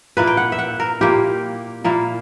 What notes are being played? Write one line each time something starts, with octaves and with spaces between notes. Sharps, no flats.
A#2 A#3 E4 B4
G5
F#5
E5
F#5
A#4
A#2 A#3 E4 G4
A#2 A#3 E4